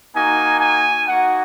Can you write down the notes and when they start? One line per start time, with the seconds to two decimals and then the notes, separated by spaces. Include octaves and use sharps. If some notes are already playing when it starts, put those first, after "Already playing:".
0.14 A#3 D#4 F#4 G#5
0.61 G#5
1.08 A#3 D#4 F#4 F#5